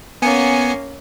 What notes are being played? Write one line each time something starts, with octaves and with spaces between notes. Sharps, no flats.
A#3 B3 C#4 G#5 C#7